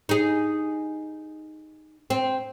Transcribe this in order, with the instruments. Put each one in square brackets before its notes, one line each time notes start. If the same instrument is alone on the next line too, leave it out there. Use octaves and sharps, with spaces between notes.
[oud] D#4 G#4
C4